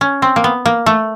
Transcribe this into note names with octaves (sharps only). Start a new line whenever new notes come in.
C#4
C4
A#3
B3
A#3
A3